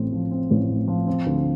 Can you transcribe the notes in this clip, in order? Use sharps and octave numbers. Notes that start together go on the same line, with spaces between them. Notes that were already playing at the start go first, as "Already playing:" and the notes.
Already playing: A1 A2 C4
F3
C4
A1
A2
F3
C4
D2